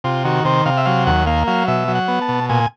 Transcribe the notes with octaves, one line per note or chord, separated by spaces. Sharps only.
C3 F4
D#3 F#4
C3 C5
C3 F5
E5
F#3 F5
D#2 F#5
A#3 F5
F#3 F5
B2 E5
F#3
F#5
B3
A5
B2
A#2 G#5